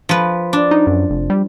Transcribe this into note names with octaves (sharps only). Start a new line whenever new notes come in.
F3 B4
D4
D#4
F#2
F1
G3